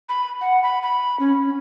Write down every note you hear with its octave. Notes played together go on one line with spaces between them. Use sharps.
B5
F#5
B5
B5
C#4